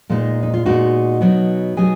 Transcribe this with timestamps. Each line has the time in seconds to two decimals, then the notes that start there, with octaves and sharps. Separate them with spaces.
0.10 A#2 G#3 B3 D#4
0.43 D#4
0.54 F4
0.65 A#2 G#3 B3 D#4 F#4
1.21 B2 F#3 B3 D#4
1.77 B2 F#3 B3 D#4 G#4